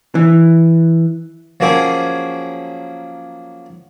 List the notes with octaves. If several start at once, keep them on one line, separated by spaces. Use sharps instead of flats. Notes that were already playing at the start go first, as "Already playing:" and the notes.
E3
F3 F#3 A#3 C#4 G#4